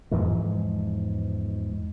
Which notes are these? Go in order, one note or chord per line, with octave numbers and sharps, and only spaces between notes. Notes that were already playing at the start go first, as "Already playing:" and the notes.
E2 G#2 F3 G#3